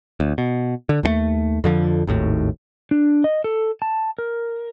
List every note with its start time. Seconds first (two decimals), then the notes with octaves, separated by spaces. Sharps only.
0.20 D2
0.38 B2
0.89 D3
1.03 D#2 E3 A3
1.64 F2 D3 F3
2.07 G#1 D#2 A2
2.91 D4
3.24 D#5
3.44 A4
3.82 A5
4.18 A#4